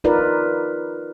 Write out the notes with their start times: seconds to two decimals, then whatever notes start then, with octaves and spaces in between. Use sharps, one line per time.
0.04 D#4 F4 A#4 B4 D5